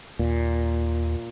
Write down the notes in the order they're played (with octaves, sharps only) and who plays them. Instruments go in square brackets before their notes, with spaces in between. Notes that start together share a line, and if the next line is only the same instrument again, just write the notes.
[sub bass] D#2 [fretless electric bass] A#2